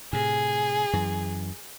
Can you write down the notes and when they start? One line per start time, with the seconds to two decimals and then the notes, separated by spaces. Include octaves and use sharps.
0.13 A2 C3 G#4
0.93 F#2 E3